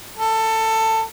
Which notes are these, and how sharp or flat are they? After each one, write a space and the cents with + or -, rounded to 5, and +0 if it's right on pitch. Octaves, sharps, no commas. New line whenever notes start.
A4 +15